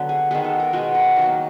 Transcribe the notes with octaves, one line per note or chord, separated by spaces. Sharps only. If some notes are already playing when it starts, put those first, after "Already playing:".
Already playing: D3 F#3 B3
G#4
D#3 G#3 B3 G#4
A4
A#4
B2 G#3 B3 B4
A#4
D#3 F#3 A#3